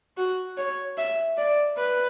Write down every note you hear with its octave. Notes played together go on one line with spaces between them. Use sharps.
F#4
C#5
E5
D5
B4